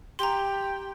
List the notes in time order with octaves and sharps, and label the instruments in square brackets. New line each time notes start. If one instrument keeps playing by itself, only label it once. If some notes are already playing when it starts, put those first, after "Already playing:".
[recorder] G4 [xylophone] A#5 C6